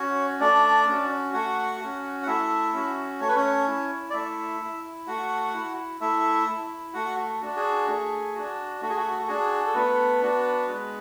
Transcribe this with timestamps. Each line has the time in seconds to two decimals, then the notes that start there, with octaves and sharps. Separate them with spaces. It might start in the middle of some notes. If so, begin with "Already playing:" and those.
Already playing: C#4 F#4 C#5
0.40 A3 D4 D5
0.87 C#4 F#4
1.33 A3 F#4 F#5
1.81 C#4 F#4
2.23 F#5
2.26 A3 E4 E5
2.73 C#4 F#4
3.20 A3 C#5
3.28 B4
3.36 C#4 C#5
3.67 E4
4.10 D5
4.13 A3 E4 E5
4.61 E4
5.07 A3 F#4 F#5
5.54 E4
6.01 A3 E4 E5
6.48 E4
6.94 A3 F#4 F#5
7.42 D4 F#4
7.56 G#4
7.88 A3
8.35 D4 F#4
8.81 A3 F#4
8.89 G#4
8.96 F#4
9.28 D4 F#4 G#4
9.66 A4
9.75 A3 B3 B4
10.22 D4 F#4
10.68 G#3